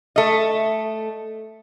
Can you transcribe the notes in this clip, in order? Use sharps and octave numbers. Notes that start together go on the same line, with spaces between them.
A3 D#5